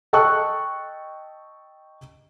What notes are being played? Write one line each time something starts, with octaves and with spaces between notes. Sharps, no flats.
D#5 G5 A5 C#6 E6 F#6